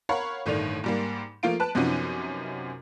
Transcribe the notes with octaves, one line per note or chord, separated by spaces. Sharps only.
A#4 C#5 F5 F#5 B5
G1 A2 D#3 A3 D5 F7
G#2 G3 A#3
F3 A3 A#3 F4 F5 D7
B4 A5 F#6
F#2 C3 F3 B3 C#4 D#4